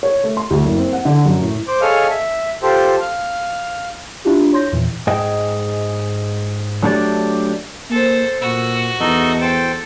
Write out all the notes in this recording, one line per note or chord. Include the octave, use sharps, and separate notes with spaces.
C#5
A3
C6
D2
F#1
C4
F#5
D3
F#2
A2
C5 D6
G#4 A4 C#5 D#5 F5
E5
F4 G4 A4 C5
F5
D4 E4 F4 G4
C#5 C6 G6 A#6
E2 A#2 E3
G#2 G#4 D#5 G5
F#3 A3 D4 G4 C5 D5
A#3 A4 C5
A#2 F#4 E6
E2 D#4 A4 D#5
A4 C5 G5